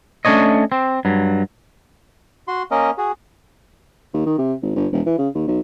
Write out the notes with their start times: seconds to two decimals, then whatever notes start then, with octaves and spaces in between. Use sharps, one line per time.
0.25 A3 C#4 D4 C#5 D#5
0.72 C4
1.05 G2 F#3
2.48 F#4 C6
2.71 A#3 C#4 A#4 D#5
2.98 F#4 G#4
4.14 D#2
4.26 D#3
4.38 C3
4.62 G#1
4.76 G1
4.92 E1
5.06 E3
5.19 C#3
5.35 D#2
5.48 B1